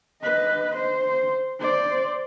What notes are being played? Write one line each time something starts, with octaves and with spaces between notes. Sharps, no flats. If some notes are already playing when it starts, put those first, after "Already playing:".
B4 D#5
C5
C5 D5